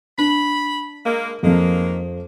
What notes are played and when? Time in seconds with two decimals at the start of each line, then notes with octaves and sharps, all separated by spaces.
0.18 D4 B5
1.06 G#3 A#3
1.43 F2 D#3 F3 G#3 A#3